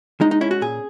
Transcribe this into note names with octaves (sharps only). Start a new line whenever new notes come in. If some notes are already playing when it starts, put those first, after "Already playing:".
G#3 D#4
D#4
C#4 E4
F#4
A#2 G#4